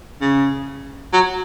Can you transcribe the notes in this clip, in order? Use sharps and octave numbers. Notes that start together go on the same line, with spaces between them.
C#3
F#3